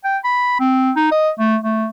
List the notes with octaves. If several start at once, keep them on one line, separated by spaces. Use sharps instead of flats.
G5
B5
C4
D#4
D#5
A3
A3